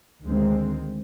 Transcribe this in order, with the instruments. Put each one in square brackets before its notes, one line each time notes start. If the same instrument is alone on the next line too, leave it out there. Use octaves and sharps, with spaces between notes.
[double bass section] D2 D#3 G#3 C4